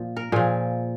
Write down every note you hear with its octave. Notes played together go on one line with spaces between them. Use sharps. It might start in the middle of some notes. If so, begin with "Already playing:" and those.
Already playing: A#2 F3
A#4
A#2 F3 G#4